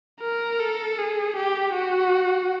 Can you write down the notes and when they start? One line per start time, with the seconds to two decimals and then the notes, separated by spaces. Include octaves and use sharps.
0.21 A#4
0.60 A4
0.98 G#4
1.37 G4
1.74 F#4